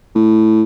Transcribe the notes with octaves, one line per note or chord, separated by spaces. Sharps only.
A2